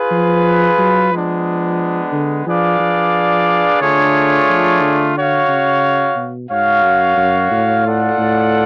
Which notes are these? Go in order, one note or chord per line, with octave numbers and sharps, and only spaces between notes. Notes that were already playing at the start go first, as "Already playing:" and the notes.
Already playing: F4 G#4 B4
F3
F#3
F3 G#3 B3 D4
D3
F3 D4 G#4 B4 D5 F5
F3
D3 A3 D4 F4 G#4 C#5
F3
D3
F#4 C#5 F5
C#3
B2
G#2 F#4 C#5 F5
F#2
F#2
A2
F4 A4 D5 F#5
A2